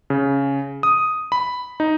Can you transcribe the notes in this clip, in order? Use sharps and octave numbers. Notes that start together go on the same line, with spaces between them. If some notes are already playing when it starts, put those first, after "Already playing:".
C#3
D#6
B5
D#4